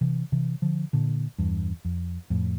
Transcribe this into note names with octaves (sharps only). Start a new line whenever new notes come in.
C3 E3
C3 E3
D3 F3
A#2 D3
E2 G2
F2
F2 A2